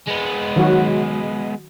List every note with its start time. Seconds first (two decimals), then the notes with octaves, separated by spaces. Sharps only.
0.07 G#3 B3
0.56 D#3 F#3 F#4